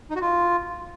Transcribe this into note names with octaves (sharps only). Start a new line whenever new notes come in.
D#4
F#4
F4